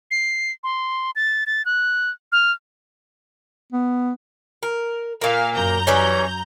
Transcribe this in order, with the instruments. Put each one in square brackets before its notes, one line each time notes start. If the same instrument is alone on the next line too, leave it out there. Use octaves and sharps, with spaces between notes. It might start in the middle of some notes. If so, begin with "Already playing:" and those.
[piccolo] C7
C6
A6
A6
F#6
F6
[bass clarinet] B3
[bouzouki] A#4
[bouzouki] A#2 A#3 [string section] F5
[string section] F#2 A#5 G6
[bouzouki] E3 G3 C#4